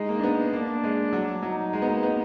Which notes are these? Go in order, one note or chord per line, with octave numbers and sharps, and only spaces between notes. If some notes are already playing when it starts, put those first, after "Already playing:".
Already playing: G#3 D#4
A#3
D4
B3
A#3 D4
G#3
F#3
F#3 D#4
G#3
B3
A#3
B3